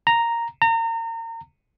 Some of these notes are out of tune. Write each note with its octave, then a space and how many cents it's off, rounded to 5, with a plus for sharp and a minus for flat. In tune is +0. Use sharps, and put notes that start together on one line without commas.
A#5 -5
A#5 -35